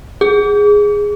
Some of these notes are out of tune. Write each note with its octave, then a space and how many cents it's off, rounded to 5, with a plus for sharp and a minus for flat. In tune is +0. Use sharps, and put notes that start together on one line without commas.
G#4 -5